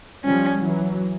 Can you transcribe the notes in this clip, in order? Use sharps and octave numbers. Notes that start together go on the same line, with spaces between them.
F3 G3 C#4
E3 F#3